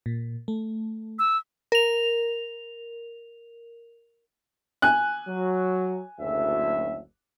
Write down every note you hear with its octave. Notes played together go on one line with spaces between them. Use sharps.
A#2
A3
E6
A#4 F7
G#5 F#6
F#3
F#1 D2 E5